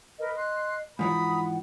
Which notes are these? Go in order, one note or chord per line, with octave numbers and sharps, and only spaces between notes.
A#4 B4 D#5
C6 F#6
G#2 E3 F3 F#5 A#5 B5 D#6